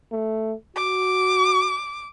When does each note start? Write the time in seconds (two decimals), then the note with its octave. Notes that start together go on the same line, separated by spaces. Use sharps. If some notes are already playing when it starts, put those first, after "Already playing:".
0.12 A3
0.76 F#4 D6